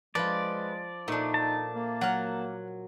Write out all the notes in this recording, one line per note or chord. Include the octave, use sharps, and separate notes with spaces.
F3 G#3 F4 B4 D5
A#2 A3 D4 D#4
A5
A#3
F#3 F#5 F6